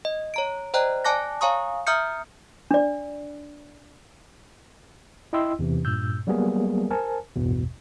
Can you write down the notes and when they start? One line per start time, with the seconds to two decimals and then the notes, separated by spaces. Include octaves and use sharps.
0.05 D#5
0.34 C#5 A#5 D7
0.74 C5 D5 D#5 G5 A#5 F#6
1.05 D5 G#5 A5 D6 F#6 A#6
1.41 C#5 F5 G#5 A#5 C#6 D#6
1.87 E5 A#5 D#6 F6 G6 C#7
2.71 D4 D5
5.33 E4 D#5 G5 C6 E6
5.59 E2 C3 E3
5.85 G2 A#2 E6 G6
6.27 F#3 G3 A#3 B3 G#4 A#4
6.90 A#4 C5 G#5 A5
7.36 A1 E2 G2 B2